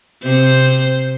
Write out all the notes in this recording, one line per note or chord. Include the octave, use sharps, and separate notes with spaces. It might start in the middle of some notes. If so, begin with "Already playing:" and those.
C3 C5